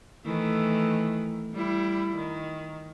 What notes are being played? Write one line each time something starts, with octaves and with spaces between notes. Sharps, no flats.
D#3 E3 A3
G3 E4
D#3